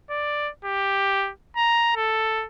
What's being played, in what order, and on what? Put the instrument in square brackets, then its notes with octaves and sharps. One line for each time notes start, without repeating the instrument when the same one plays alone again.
[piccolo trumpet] D5
G4
A#5
A4